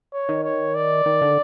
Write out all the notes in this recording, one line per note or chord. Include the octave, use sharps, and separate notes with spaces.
C#5
D#3
C#5
D5
D#3
D3